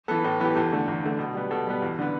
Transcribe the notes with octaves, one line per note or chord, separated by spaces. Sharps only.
E3 B3 A4
A2 A4
E3 B3 G4
E2 A4
D3 A3
E2
D3 A3
B2
G3 B3
B2 A4
G3 B3
E2
D3 B3